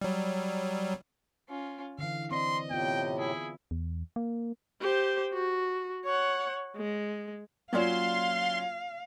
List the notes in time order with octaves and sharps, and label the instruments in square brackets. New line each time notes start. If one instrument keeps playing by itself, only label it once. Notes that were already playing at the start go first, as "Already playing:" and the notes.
[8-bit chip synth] F#3 G3
[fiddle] C#4 F4
[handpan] D3 E3 [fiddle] F5
[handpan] C4 D5 [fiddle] D#5 [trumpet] C6
[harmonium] A2 C3 [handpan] B3 F4 [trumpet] G5
[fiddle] E4 [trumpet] G#4
[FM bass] E2
A#3
[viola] G4 C5
F#4
C#5 F#5
G#3
[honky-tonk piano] F#3 C#4 F4 [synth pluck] A#3 D5 E7 [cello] F5 [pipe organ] C6